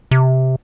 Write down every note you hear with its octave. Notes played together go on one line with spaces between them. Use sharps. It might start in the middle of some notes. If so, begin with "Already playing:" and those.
C3